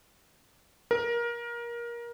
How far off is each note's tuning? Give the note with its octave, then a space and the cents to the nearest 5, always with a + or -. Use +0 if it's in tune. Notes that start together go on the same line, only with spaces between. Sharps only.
A#4 +20